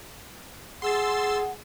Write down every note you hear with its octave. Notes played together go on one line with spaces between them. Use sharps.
G#4 F#5 C6 E6 A6